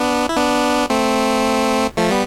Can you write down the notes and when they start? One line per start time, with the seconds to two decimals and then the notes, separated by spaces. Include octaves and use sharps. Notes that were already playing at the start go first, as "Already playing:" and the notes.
Already playing: B3 D4
0.29 E4
0.36 B3 D4
0.90 A3 C4
1.98 F3 A3
2.11 G3 B3